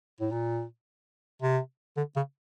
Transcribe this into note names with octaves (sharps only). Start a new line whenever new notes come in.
A2
A#2
C3
D3
C#3